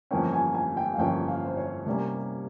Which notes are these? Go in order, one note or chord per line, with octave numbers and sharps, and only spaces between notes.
G1 F2 E3 A#3 C#4 G5
G#5
G#5
G5
F5
G1 F2 E3 A#3 C#4 G5
F5
C5
C#5
C2 C3 G3 A#3 C#4